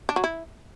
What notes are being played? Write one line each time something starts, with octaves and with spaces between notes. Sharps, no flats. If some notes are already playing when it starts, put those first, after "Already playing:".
D4
F#3
E4